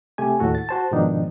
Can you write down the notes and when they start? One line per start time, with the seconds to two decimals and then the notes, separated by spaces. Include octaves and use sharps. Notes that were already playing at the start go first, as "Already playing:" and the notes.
0.18 C3 A3 G4 G#5
0.39 D#2 A2 F#4 A4
0.55 A6
0.69 F#4 C5 A5
0.92 G#2 B2 D#3 F3 D4 D#4